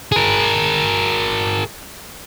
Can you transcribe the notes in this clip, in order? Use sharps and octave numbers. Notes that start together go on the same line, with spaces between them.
G#4 A#4